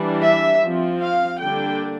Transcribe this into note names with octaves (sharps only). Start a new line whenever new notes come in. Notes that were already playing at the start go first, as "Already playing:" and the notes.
Already playing: E3 G3 D4
E5
F3 C4
F5
D3 G3 A#3 D4 G5